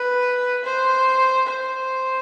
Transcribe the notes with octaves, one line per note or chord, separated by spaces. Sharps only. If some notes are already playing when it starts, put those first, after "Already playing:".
Already playing: B4
C5
C5